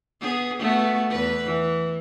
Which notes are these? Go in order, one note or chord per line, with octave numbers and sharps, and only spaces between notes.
B3 G#4
A3 B3 F#4
E2 B4
E3